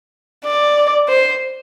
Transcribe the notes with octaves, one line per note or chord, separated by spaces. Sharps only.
D5
C5